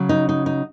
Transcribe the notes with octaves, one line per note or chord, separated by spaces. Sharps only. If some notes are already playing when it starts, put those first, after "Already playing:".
Already playing: C#3 F#3 C#4
D#4
D#4
D#4